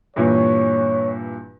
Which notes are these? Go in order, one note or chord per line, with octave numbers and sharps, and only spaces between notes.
G2 A#2 E3 C#5